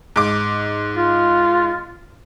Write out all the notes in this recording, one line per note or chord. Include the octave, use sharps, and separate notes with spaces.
G#2 D6
F4